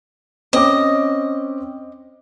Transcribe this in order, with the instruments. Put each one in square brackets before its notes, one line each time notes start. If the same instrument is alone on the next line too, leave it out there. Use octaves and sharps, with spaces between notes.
[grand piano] C4 C#4 D6 [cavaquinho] D#5